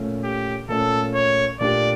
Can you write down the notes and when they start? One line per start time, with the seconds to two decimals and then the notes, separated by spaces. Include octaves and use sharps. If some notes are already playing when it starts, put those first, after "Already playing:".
Already playing: A#2 A3 C#4
0.23 G4
0.68 A#2 A3 C#4 A4
1.14 C#5
1.59 A#2 A3 D4 G4 D5